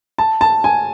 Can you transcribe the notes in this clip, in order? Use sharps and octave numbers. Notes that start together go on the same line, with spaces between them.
A5
A5
G#5